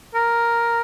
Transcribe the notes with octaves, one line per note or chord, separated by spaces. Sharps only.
A#4